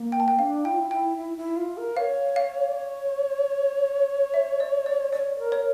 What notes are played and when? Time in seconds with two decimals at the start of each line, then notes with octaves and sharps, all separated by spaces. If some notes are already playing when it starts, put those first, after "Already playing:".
Already playing: A#3
0.12 G5
0.20 A5
0.28 G5
0.39 D4 F5
0.65 E4 G5
0.72 F4
0.80 E4
0.91 E4 G5
1.17 E4
1.37 E4
1.57 F4
1.77 A#4
1.97 C#5 F5
2.36 F5
2.68 D5
2.76 C#5
4.34 E5
4.60 D5
4.86 D5
5.13 C#5 D5
5.39 A#4
5.52 C#5